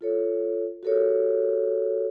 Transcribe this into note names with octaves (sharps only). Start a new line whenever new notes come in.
F4 A4 C#5
F#4 G4 A4 A#4 C#5